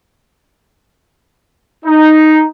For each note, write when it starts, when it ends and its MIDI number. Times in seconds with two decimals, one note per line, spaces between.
1.85 2.44 63